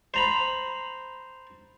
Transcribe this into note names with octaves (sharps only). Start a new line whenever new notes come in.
C5 A#5 B5